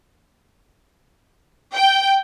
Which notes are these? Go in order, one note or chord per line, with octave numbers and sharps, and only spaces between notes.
G5